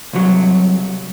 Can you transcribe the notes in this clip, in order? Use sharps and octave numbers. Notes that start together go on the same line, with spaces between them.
C2 F#3